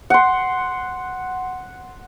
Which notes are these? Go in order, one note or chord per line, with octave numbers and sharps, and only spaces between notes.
F#5 C6